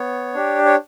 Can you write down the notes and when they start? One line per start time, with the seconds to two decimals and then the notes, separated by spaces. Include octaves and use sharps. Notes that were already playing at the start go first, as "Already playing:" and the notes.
Already playing: B3 C#5
0.34 D4 G4
0.66 C#5